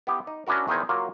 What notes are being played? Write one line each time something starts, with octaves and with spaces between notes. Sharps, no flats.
B3 E4 G4
D#4
C#4 D4 E4 F#4 A#4
E2 D#3 D#4 E4 C5 G#5
F#3 A#3 F4 A#4